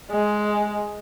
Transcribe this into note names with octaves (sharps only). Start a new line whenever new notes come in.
G#3